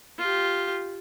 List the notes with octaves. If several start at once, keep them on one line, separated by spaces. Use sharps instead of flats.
F4 G4